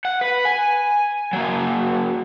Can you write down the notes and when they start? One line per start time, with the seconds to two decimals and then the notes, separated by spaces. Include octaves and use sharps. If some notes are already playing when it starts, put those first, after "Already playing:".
0.05 F#5
0.21 B4
0.45 G#5
1.33 F#3 A#3